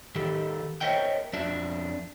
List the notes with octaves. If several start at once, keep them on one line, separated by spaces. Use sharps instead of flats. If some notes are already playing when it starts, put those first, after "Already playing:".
D#3 G4 A4
A#4 C5 C#5 D#5 E5 G5
F2 D4 E5